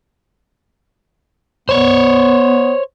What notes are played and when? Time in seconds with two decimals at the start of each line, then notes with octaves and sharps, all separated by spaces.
1.69 B3 C5 C#5